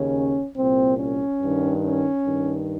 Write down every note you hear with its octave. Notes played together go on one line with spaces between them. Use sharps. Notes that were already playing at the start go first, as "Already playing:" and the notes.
Already playing: D#2 C#3 C#4
C2 A#2 C4
C#4
G2 D#3
C#4
G2 D#3